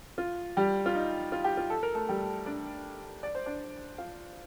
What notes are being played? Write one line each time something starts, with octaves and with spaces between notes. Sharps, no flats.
F4
G3 G4
F4
D#4
F4
G4
F4
A4
A#4
A3 A4
G3 G4
D4 D5
D5
C5
D4 D5
F4 F5